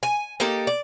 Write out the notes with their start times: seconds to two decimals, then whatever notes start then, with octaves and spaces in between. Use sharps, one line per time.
0.03 G#5
0.40 A#3 D#4 G4 A4
0.67 D5